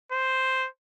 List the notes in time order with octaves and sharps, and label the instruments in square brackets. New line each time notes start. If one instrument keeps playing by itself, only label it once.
[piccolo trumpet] C5